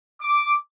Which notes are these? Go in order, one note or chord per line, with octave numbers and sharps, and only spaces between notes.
D6